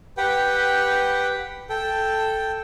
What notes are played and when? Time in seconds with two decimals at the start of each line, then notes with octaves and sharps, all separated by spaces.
0.17 G4 B4 F#5 G5
1.70 A4 G5